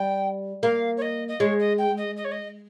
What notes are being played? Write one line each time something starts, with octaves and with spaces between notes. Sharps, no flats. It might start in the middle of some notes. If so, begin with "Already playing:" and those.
Already playing: G3 G5
A#3 F5
C#5
D#5
D#5
G#3 C#5
D#5
G5
D#5
D#5
C#5
D#5